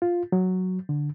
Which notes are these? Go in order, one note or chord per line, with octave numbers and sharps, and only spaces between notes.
F4
F#3
D3